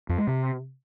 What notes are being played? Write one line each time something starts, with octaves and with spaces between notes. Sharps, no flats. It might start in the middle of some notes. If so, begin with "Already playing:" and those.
F2
G#3
C3